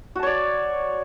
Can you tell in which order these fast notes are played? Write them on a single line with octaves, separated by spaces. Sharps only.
F#4 A5 C#5 D5